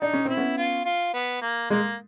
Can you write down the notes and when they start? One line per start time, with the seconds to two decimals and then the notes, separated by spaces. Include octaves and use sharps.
0.01 D4 D#4
0.13 C#4
0.25 C4 E4
0.37 B3 C#4
0.57 F4
0.85 F4
1.14 B3
1.42 A#3
1.70 G#3 A#3